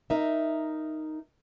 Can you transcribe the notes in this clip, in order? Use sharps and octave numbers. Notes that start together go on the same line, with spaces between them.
D#4 A#4 E5